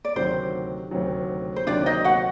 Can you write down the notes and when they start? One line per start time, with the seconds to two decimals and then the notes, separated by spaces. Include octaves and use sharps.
0.05 D5
0.16 D2 C3 D#3 F#3 C5
0.91 D2 C3 D#3 F#3
1.56 C5
1.67 D2 C3 D#3 F#3 D4 D5
1.86 D#4 D#5
2.04 F#4 F#5